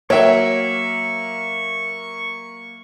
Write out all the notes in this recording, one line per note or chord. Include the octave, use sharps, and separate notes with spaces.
F#3 A#3 C#5 E5 G5 C#6